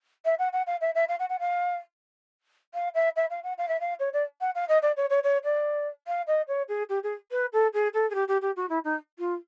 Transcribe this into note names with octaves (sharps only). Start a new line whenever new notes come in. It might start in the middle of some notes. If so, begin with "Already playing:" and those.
E5
F#5
F#5
F5
E5
E5
F5
F#5
F#5
F5
F5
E5
E5
F5
F#5
F5
E5
F5
C#5
D5
F#5
F5
D#5
D5
C#5
C#5
C#5
D5
F5
D#5
C#5
G#4
G4
G#4
B4
A4
G#4
A4
G#4
G4
G4
G4
F#4
E4
D#4
F4